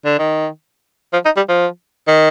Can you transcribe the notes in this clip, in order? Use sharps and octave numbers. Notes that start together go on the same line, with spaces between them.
D3
D#3
F3
D#4
G3
F3
D#3